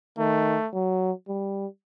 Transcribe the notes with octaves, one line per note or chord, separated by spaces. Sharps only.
D#3 A3
F#3
G3